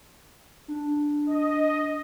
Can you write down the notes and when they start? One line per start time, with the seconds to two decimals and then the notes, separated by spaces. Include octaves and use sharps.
0.68 D4
1.26 D#5